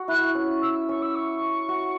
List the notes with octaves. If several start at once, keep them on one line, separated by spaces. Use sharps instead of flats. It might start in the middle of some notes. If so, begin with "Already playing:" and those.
Already playing: F#4 F#5 A5
E4 F#6
C#4
E6
C#4 C#6
E6
C#6
F#4